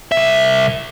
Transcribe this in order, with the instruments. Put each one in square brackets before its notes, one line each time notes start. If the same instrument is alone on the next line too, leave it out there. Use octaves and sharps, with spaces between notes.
[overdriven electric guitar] C2 E5